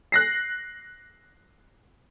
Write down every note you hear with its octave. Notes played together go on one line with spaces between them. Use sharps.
F#6 A#6 C7